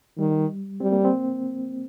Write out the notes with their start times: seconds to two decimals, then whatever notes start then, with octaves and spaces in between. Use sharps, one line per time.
0.18 D#3 G3
0.80 G3 C4
0.92 A#3
1.05 C4